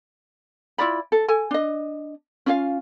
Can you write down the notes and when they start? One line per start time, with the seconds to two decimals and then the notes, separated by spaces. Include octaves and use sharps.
0.78 E4 F4 D5 B5
1.12 A4
1.28 A4 G#5
1.51 D4 D#5
2.46 C#4 F4 F5